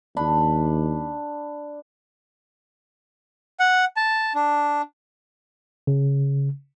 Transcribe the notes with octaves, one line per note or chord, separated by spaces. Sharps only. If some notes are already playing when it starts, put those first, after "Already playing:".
D#2 D4 B5
F#5
A5
D4
C#3